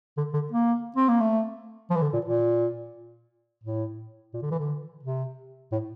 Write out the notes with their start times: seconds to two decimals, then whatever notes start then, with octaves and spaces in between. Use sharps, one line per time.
0.17 D3
0.34 D3
0.52 A#3
0.97 C4
1.09 A#3
1.21 A3
1.90 F3
1.96 E3
2.02 D3
2.14 A#2
2.25 A#2
3.64 A2
4.34 A#2
4.42 D3
4.51 E3
4.60 D3
5.03 C3
5.72 A2